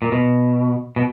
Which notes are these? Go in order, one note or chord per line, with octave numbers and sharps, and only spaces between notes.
A#2
B2
B2